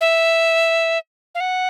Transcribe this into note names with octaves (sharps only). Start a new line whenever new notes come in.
E5
F5
F#5